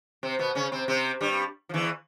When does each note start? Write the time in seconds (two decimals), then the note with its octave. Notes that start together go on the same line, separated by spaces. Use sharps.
0.23 C3 C4
0.39 B2 B3
0.55 C#3 C#4
0.72 C3 C4
0.88 C3 C4
1.21 G2 G3
1.69 F3
1.74 E2 E3